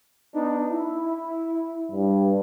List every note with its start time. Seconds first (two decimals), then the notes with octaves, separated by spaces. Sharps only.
0.34 B3 D4 D#4
0.71 E4
1.92 G2